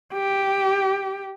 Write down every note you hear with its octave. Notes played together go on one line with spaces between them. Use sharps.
G4